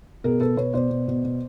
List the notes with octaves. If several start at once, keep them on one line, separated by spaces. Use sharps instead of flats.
B2 G#4 A#4
B2 A4 B4
B2 B4 C#5
B2 C5 D5
B2
B2
B2